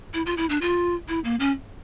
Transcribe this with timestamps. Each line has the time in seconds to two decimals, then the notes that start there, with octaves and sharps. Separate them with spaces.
0.14 E4
0.26 F4
0.37 E4
0.49 D4
0.61 F4
1.08 E4
1.24 A#3
1.40 C#4